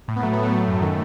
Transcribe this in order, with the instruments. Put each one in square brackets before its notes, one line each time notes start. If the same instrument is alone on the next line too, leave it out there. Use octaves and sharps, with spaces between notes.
[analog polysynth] A2
B3
F#3 A3
B3
A2
A3
F#3
F#2
D#3